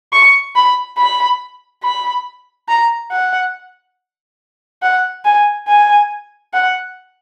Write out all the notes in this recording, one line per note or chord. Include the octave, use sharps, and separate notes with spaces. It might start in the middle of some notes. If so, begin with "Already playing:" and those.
C#6
B5
B5
B5
A#5
F#5
F#5
G#5
G#5
F#5